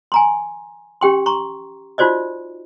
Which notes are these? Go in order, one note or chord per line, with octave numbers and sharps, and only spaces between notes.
G#5 A#5 C6
C#4 G4 G5 C6
A#5 C6 C#6
D#4 F4 F#4 C5 D5 D#5